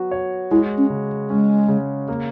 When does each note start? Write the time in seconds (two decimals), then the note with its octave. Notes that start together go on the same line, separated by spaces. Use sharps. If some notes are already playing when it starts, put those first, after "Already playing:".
Already playing: F#3 B3 F#4
0.11 C#5
0.51 G#3 E4
0.78 C#4
0.90 C#3
1.30 G#3 C#4
1.68 C#3
2.08 A#3